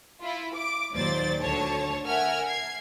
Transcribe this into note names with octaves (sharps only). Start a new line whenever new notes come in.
E4 F4
D6
D#2 A#2 F#3 C5 D5 A6
D2 D3 C#5 A5
A#4 E5 F#5 G#5 F6 G#6
G#6 C7